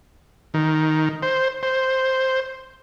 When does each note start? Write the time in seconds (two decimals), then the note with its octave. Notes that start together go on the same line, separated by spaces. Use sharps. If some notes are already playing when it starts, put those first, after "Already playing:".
0.54 D#3
1.22 C5
1.63 C5